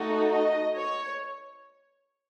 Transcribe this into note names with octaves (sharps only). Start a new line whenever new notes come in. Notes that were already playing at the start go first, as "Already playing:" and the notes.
Already playing: A3 D#4 F#4 A4
D#5
C#5